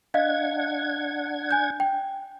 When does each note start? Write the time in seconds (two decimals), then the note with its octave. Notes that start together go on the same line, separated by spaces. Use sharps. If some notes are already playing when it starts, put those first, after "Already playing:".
0.14 D4 D#5 F5 F#5 G#6
1.51 G#5 G6
1.80 G5